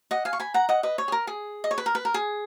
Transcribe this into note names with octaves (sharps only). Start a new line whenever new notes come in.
D#5 F#5
F5 G#5
C#6
G#5 B5
F#5 A#5
D#5 F#5
B4 D#5
C#5
G#4
A#4
G#4
D#5
C#5
B4
A#4
B4
A#4
G#4